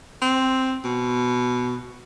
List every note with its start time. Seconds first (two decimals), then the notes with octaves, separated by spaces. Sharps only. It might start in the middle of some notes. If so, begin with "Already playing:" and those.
0.22 C4
0.84 B2